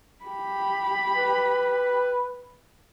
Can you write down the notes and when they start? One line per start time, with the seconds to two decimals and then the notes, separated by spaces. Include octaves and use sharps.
0.24 G4 B5
1.17 B4